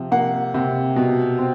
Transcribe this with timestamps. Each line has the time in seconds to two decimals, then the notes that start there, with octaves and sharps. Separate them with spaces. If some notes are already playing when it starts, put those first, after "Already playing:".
Already playing: C3 F3
0.12 A#3 F#5
0.54 C3
0.96 B2
1.38 C4